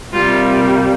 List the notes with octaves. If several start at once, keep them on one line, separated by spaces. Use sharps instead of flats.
C3 G3 A#3 F4